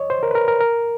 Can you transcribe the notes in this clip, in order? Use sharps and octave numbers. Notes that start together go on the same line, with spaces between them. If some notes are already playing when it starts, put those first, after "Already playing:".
Already playing: C#5 D#5
C5
A#4
B4
A#4
A#4
A#4